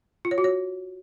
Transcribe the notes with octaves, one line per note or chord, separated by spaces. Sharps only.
F4
C#5
F#4
C#5